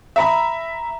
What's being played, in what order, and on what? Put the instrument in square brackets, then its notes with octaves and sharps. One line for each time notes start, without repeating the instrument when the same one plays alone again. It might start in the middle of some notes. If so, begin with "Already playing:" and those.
[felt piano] E5 A#5 B5